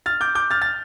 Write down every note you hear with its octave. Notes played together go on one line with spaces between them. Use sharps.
F6 A6
D6 G6
D6 G6
F6 A6
F6 A6